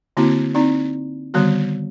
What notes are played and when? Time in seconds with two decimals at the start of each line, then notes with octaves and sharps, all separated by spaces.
0.17 D3 A#3 C4 E4 F#4
0.54 C4 D#4 D5
1.34 D3 D#3 G3 B3 F#4